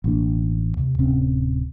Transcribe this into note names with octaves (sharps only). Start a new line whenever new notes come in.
A1 B2 A#3 D4
D#2 C3
D1 C3 C4 C#4